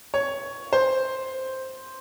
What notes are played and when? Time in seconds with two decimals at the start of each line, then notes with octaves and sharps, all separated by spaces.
0.14 C#5
0.73 C5